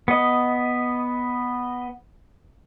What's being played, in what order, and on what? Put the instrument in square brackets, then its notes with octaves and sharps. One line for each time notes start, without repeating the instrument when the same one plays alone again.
[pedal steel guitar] B3 D#5